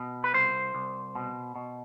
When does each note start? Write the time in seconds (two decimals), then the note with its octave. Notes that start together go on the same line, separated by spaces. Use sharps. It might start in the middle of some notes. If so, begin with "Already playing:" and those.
Already playing: B2
0.24 B4
0.34 C2 C5
0.75 C2
1.15 B2
1.55 B2